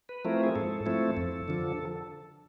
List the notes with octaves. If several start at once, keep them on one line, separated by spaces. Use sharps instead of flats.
B4
F3 A3 C4 E4 A#4
G#4
G#2 A4
F3 A3 C4 E4
F2
D3 F3